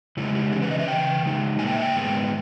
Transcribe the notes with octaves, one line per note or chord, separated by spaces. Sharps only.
C#3 G#3 D#4 E4
G4
C#3 E3 C#4 G#4
B4
D#5
E5
C#3 E3 G5
C#3 G#3 D#4
A#2 A#3 D#4 G#5
G5
E5
G5
G#2 D#3 G#3 B3